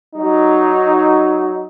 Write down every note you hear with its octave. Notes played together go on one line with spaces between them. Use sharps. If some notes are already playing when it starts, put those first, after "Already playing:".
F#3 D#4